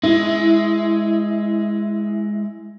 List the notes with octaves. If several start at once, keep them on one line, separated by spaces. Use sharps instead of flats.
G#3 E4